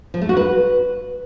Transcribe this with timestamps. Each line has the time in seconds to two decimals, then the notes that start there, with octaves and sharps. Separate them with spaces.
0.14 F3
0.21 A3
0.29 F#4
0.37 B4